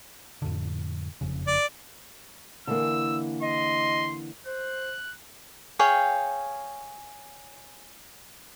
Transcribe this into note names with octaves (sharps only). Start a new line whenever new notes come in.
F2 A2 D3
F#1 F2 C#3
D5
D3 E3 A#3 E6
D#5 C6
C5 F#6
G#4 C#5 F5 G5